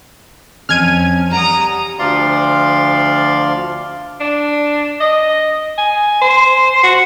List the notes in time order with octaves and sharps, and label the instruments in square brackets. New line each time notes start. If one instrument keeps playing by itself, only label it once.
[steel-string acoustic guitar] F2 C#4 [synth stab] F6 G#6 D#7
[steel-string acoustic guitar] G3 F#5 [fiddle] A#5 D#6
[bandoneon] D2 F3 D5 F5 C6
[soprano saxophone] D4
D#5
G#5
C5
F#4